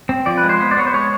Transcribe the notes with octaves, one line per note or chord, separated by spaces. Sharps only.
C4
F3 D5
B4
G#3
C5
B3
D5
B3 C#5
C5
G#3 C#5